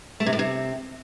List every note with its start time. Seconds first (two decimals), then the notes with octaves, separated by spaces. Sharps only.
0.20 A3
0.26 C3
0.33 A2
0.39 C3